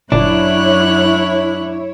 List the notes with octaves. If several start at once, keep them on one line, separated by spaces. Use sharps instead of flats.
G1 F#2 A#2 D4 E4 C#5 F#6